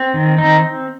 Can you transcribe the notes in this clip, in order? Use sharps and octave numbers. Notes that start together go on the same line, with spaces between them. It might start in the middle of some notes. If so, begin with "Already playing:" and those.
Already playing: C4
D#3
C4 D#4